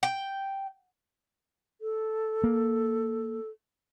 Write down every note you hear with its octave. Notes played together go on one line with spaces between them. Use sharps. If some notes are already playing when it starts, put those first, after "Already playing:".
G5
A4
A#3